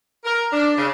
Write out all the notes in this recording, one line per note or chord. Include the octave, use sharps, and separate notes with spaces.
A#4
D4
C#3